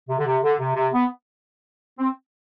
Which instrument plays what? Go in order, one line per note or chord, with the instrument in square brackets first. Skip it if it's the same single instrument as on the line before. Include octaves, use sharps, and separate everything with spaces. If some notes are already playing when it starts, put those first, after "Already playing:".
[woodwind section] C3
D3
C3
D3
C3
C3
B3
C4